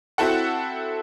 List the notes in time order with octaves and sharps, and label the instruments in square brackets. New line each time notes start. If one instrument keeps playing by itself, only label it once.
[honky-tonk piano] C4 E4 F#4 A4 F#5